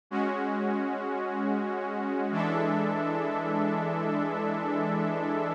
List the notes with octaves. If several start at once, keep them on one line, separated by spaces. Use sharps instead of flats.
G#3 C#4 F#4
E3 G#3 D4 A4 E5